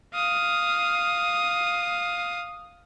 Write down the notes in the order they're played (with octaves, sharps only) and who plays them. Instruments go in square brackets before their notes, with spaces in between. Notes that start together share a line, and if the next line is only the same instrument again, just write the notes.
[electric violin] F5 D#6